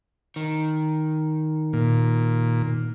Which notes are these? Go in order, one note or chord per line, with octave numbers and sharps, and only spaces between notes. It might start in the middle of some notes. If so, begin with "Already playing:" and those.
D#3
A#2